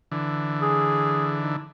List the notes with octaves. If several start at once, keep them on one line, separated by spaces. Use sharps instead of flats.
D3 E3
G#4
D#4